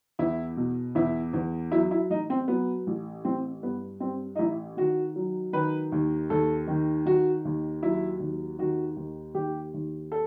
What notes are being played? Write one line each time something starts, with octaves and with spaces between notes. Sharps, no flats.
E2 E4
B2
E2 E4
E2
F#3 E4
E4
A1 D#4
C4
F#3 B3
A1
A1 C4
G2 B3
G2 C4
D#4
A1 E4
D#3 F#4
F#3
D#3 B4
D#2
D#2 A4
D#3
D#3 F#4
D#2
F#3 E4
D#2
D#3 F#4
D#2
D#2 G4
D#2
A4